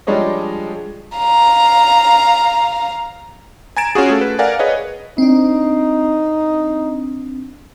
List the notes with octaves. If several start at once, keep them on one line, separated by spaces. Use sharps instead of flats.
F3 G3 G#3 D4 C#5 D#5
F5 A#5
G#5 A#5 G#6 A6 D7 E7
C#4 F4 F#4 G#4
A3 A4
B4
A#4 D5 F5 F#5 G#5
G#4 B4 C#5 D#5
C4 D4 D#4